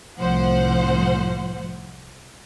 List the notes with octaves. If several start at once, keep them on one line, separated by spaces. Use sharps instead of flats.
C2 A2 F3 C5 F#5